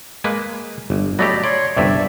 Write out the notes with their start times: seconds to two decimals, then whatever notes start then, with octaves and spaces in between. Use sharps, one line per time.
0.24 G#3 A#3 B4
0.90 G1
1.19 F#3 A3 G4 D5 D#5 B5
1.44 C#5 D5 C6
1.77 G1 G2 C3 D5 E5 E6